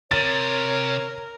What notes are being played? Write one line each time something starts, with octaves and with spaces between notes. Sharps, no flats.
C3 A#4 C#5 A6